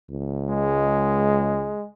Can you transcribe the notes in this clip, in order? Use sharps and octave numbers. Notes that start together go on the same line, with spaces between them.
C#2
G#3